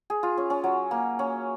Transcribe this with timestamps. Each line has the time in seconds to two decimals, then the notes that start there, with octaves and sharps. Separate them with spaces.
0.10 G#4
0.23 F4
0.37 C#4
0.50 C#4
0.64 F#3
0.91 A#3
1.19 C#4